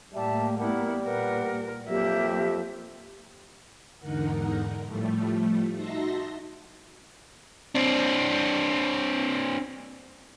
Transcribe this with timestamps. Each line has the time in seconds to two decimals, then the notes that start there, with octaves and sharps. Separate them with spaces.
0.14 A2 G3 A#3 E5 A5
0.58 G3 B3 E4 A#4 F#5
1.04 A#2 A#4 B4 F#5
1.89 F2 F#3 A#3 G4 E5
4.00 E2 G#2 D3 D#4 A#4 F#5
4.85 A2 F3 G3 A3
5.74 D#4 F#4 E5 A5 C6 A#6
7.75 C4 D4